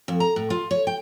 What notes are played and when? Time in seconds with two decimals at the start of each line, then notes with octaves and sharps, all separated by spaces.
0.08 F2
0.20 A#5
0.36 A2
0.50 F4
0.71 C#5
0.87 G5